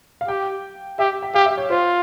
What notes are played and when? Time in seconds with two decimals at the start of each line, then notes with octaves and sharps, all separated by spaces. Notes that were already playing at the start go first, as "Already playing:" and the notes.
0.21 F5
0.28 G4 G5
0.99 G4 E5
1.23 G5
1.34 G4 F5
1.46 E5
1.58 C#5
1.70 F4 C5